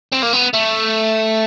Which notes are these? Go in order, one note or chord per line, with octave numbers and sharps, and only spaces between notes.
C4
A#3
B3
A3